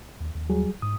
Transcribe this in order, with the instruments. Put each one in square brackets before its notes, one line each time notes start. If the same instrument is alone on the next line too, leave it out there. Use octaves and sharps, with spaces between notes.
[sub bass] D#2
D#2
[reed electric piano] F#3 G3 G#4
[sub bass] G#2 [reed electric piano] D#6